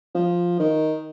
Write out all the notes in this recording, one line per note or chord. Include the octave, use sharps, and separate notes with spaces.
F3
D#3